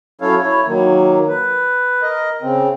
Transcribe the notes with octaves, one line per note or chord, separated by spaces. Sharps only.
F#3 C#4 E4 A4 C#5 F5
E4 C#5
D#3 F#3 A#3
B4
A#4 D#5
C#3 C4